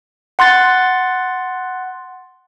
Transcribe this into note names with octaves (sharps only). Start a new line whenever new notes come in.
F#5 C6 F#6 A6